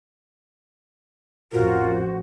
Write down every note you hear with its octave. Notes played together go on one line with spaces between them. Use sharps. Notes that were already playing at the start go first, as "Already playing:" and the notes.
A1 F2 F4 F#4 A#4 C5